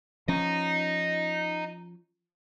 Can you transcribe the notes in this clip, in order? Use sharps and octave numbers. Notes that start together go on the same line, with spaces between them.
F3 C#4 D#5 A#5